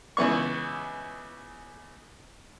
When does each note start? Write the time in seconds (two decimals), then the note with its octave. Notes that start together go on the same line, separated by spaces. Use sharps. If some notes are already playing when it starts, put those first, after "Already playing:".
0.17 C#2 E3 B3 C#6